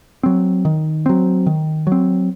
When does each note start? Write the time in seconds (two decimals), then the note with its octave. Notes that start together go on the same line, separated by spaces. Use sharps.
0.23 F#3 C4
0.65 D#3
1.06 F#3 C4
1.46 D#3
1.87 F#3
1.92 C4